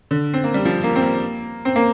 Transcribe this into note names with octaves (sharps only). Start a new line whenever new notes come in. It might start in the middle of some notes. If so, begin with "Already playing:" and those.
D3
C4
A#3
G3
F3
A#3
C4
A#3
C4
A#3